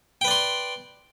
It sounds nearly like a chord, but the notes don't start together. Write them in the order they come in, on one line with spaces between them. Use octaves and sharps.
G5 B4 D5 C6